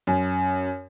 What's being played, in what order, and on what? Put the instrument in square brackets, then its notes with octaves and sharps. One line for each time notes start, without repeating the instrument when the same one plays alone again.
[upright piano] F#2